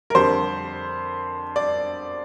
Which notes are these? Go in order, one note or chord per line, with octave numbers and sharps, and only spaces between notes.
A#4
F2 D3 G3 C5
D5